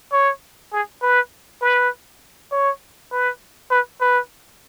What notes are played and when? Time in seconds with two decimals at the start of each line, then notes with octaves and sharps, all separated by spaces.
0.13 C#5
0.72 G#4
1.02 B4
1.62 B4
2.52 C#5
3.12 B4
3.71 B4
4.01 B4